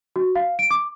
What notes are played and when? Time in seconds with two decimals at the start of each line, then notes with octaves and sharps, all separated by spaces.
0.16 F#4
0.36 F5
0.59 D7
0.71 D6